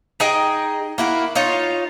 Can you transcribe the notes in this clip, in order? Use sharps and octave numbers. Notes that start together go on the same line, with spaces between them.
D#4 G#4 D#5 G5
A#3 E4 F#4
D#4 F4 C#5